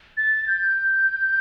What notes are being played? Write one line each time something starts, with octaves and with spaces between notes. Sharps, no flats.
A6
G6